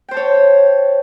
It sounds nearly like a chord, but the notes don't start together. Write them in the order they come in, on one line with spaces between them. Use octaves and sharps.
G5 C5 A5 C#5